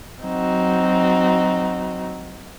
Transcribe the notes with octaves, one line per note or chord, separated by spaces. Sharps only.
F#3 C4 D#4 F#4